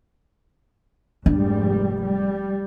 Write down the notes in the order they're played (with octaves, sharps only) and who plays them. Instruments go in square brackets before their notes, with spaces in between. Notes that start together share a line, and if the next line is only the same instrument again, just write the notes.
[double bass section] F1 G#2 G3 [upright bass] D4
[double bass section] G3